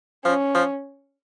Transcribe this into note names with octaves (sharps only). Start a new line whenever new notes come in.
F3 C#4
F3